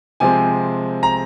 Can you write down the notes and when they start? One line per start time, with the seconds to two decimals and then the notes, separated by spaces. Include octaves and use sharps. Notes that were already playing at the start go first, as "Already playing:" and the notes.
0.20 C3 F3 G#3 C4 G#5
1.03 A#5